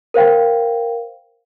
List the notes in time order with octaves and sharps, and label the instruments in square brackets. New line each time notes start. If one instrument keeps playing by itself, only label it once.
[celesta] A#4 C5 F5 G5